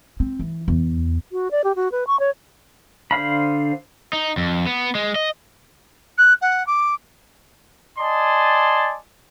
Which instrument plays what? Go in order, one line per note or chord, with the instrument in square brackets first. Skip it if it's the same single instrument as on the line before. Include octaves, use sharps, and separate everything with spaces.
[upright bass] C4
E3
E2
[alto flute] F#4
D5
G4
F#4
B4
C#6
C#5
[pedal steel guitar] D3 C5 F5 B5
[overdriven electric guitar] D#4
F2
B3
G#3
D#5
[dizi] F#6
F#5
D6
[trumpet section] D5 D#5 G#5 A5 C6